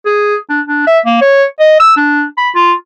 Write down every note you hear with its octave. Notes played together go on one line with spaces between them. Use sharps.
G#4
D4
D4
E5
A#3
C#5
D#5
E6
D4
B5
F4